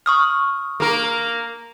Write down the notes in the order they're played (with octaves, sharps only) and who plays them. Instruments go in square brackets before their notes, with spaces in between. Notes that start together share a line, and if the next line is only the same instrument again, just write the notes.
[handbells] C#6 D#6 F6
[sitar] A#3 A#4